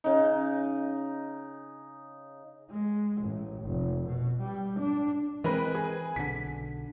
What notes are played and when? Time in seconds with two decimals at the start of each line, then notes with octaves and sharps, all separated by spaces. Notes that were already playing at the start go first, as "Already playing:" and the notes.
0.04 C#3 D#4
2.70 G#3
3.21 A1
3.63 F1
4.06 B2
4.41 G3
4.79 D4
5.44 E3 G#3 C4 A#4 B4
5.75 G#4
6.16 B1 D3 B6